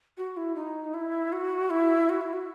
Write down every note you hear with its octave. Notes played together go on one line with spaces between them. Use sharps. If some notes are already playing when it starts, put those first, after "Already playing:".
F#4
E4
D#4
E4
F#4
E4
F#4
E4
F#4